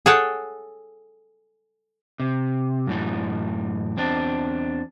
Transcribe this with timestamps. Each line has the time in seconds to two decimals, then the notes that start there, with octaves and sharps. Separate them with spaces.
0.06 G#4 A4 C#5 F#5 G5 A5
2.20 C3
2.87 F#2 A2 E3
3.97 E2 C4 D4